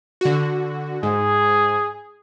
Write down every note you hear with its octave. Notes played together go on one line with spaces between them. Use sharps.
D3 F#4
G#2 G#4